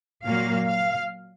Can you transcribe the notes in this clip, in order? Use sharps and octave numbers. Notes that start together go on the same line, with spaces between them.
A#2 F#3 A#3 F5
F5